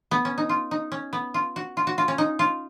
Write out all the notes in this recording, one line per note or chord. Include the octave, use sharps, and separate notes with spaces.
B3
C#4
D#4
F4
D#4
C#4
B3
F4
F#4
F4
F#4
F4
C#4
D#4
F4